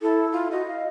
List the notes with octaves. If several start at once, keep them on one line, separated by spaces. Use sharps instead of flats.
E4 A4
F4
F#4 D#5
F5